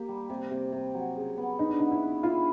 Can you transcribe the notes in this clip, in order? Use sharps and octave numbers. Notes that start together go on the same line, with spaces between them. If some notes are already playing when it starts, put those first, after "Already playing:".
Already playing: A#3 G4
G3
C3
C3
C3
F#3
C#3
B3
D#4 B4
D4
D#4 F#4
E4
B4
E4 F4